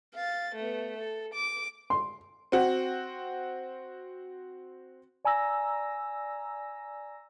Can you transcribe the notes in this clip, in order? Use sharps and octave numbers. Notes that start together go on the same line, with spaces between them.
F5 A6
A3 B3
A4
D6
C6
C4 F#4
D5 G#5 A#5 E6 A#6